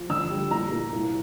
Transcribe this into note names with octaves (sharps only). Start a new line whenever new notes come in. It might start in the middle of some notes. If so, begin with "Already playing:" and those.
Already playing: F3
D3 E6
G3
A#2 A#5
A#2
C2